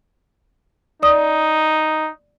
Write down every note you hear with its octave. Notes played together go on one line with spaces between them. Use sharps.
D#4 D5 D#6